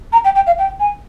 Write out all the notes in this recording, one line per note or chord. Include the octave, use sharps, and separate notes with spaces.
A#5
G5
G5
F5
G5
G#5